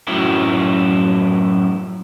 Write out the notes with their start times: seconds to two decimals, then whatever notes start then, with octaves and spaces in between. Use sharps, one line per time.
0.07 F#2 A2 F3 F#3 E4